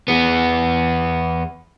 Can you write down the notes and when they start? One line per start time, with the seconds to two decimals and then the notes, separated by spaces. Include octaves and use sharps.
0.08 E2 B3